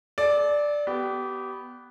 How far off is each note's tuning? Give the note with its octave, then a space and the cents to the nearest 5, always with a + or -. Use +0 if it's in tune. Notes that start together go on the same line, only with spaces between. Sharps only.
A4 -40 D5 +0
B3 +0 G4 -25